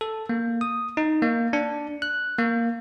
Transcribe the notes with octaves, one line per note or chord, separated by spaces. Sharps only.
A4
A#3
D#6
D#4
A#3
D4
F#6
A#3